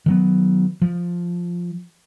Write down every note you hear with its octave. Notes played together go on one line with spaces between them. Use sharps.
D#3 F#3 B3
F3